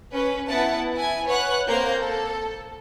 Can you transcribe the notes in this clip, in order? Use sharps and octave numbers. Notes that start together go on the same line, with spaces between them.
C#4 B4
B3 E4 B4 F#5 A5
E4 G#5
B4 C#5 F#5 F#6
A#3 C4 A#4 C5 A#5 G6
A4